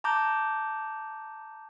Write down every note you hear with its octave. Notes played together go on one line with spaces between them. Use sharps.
A5 A#5 D6 G6